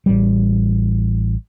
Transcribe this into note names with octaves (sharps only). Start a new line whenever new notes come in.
A1 G3